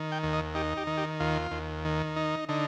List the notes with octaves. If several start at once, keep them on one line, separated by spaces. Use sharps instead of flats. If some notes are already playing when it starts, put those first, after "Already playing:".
Already playing: D#3
G5
D#2
D#5
D#4 G4
G4
D#3
G4
D#2 F4
D#2
D#3
D#4
D3 D#4